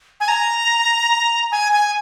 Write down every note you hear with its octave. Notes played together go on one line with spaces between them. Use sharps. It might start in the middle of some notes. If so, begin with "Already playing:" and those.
G#5
A#5
G#5
G#5